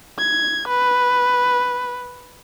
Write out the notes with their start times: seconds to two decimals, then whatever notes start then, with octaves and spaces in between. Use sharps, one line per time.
0.19 G#6
0.68 B4